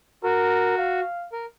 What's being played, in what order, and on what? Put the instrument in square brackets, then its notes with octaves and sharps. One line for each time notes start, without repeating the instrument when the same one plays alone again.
[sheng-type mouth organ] F#4 [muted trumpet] A#4
[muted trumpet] F5
[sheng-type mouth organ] A#4